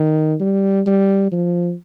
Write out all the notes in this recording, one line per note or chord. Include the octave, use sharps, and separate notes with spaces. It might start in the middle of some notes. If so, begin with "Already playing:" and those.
Already playing: D#3
G3
G3
F3